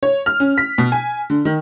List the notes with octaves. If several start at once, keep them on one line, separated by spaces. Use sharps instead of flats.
C#5
F6
C#4
B6
B2
G#5
D3
D#3